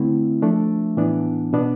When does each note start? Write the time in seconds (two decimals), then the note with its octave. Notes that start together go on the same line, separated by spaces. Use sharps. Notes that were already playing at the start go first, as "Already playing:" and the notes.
Already playing: D3 A3 C4 E4
0.42 F3 A3 D4
0.97 A2 E3 B3 D4
1.53 B2 B3 D4